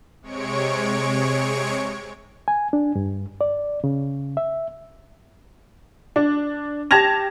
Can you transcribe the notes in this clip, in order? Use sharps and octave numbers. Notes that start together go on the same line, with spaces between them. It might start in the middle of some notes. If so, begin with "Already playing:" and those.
C3 G#3 C#5 C#6 D7
G#5
D4
G2
D5
C#3
E5
D4
G4 A5 G#6 A#6 F7